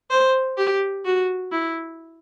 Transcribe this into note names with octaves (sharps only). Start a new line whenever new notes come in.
C5
G4
F#4
E4